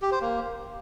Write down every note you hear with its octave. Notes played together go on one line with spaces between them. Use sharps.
G4
C5
A#3